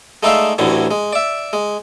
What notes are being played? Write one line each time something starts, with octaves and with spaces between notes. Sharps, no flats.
G#3 A3 D#4 D5 E5 F5
A1 D2 A2 D3 E3 F#3
G#3
D5 E5
G#3